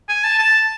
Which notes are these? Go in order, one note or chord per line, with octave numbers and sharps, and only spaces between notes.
G#5
A5
A5